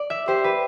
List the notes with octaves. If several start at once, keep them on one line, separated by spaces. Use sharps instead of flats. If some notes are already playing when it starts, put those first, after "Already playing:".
Already playing: D5
E5
G4 C5
B4